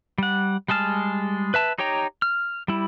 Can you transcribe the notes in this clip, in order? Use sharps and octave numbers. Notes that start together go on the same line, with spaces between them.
G3 F#5
G3 G#3 G#4 A5 F6
B4 E5 A5
D#4 G4 C#5 G5 A#5
F6
G3 E4